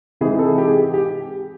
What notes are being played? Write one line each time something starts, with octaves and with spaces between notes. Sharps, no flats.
C3 E3 G#3 C4 D#4 G#4
A4
G4
G#4
G4
G4